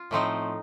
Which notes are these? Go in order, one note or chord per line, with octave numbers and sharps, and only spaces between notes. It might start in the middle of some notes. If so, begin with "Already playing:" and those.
Already playing: F4
A2 F3 A3 C4 D#4